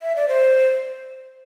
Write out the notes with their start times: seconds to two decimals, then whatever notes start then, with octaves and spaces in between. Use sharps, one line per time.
0.02 E5
0.16 D5
0.28 C5